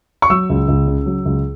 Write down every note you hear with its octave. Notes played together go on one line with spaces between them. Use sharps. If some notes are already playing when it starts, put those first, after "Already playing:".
C#6
F#3 E6
C#2
C#2
C#3
F#3
C#2